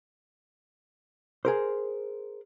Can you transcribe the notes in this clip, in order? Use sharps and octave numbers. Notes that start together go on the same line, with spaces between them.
G#4 A#4 C5